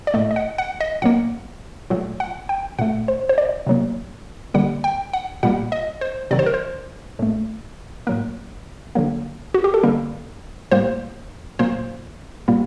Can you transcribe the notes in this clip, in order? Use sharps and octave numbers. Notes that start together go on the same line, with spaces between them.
D5
A2 A3 D#5
D#5
F#5
F#5
D#5
A#2 F#3 A#3 F#5
A#2 F#3 A3
F#5
G5
A#2 A3 F#5
C5
C5
D5
C3 F#3 A#3
D3 G3 A#3 F#5
G5
F#5
A#2 G3 A#3 F#5
D#5
C5
C3 D#3 F#3 D5
C5
A#4
C5
A2 A3
A2 F#3 A#3 A#4
D3 F#3 A#3
F#4
G4
A4
D3 G3 A#3 A#4
A2 G3 A#3 C5
A#2 F#3 A#3 C5
A#2 G3 A#3